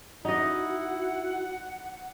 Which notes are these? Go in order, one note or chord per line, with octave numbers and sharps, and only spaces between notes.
D#4 E4 F#4 D#5 F#5